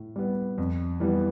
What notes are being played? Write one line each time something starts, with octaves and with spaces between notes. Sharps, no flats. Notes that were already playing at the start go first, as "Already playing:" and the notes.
Already playing: A2
G3 B3
F2
E3 G3 B3